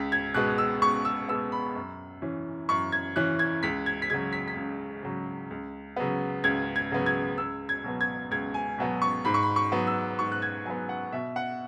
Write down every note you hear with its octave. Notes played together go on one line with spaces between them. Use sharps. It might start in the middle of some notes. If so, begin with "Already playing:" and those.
Already playing: C#2 B6
G#6
B2 G#3 B3 F#6
E6
C#2 C#6
E6
B2 G#3 B3 E6
B5
F#2
E3 C#4
F#2 C#6
G#6
E3 C#4 F#6
G#6
C#2 B6
G#6
B6
C#3 F#3 G#6
B6
B6
C#2
C#3 F#3
C#2
C#3 F#3 B3
C#2 G#6
G#6
C#3 F#3 B3
G#6
C#2 E6
G#6
B2 F#3 B3
G#6
C#2 G#6
G#5
B2 F#3 B3
C#6
G#2 B5
C#6
B5
C#6
F#3 B3
E6
G#2 C#6
F#6
G#6
F#3 B3 G#5
F#5
B2 E5
F#5